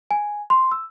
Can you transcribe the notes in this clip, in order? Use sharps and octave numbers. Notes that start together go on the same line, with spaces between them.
G#5
C6
E6